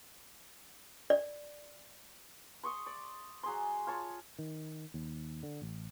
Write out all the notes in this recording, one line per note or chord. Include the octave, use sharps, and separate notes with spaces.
D5
C6 C#6 D#6
D5
F#3 G#4 C6
F4 C#5 A5
D#3
D#2
D3
A1